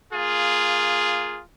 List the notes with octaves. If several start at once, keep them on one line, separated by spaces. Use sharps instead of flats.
A#3 F4 G#4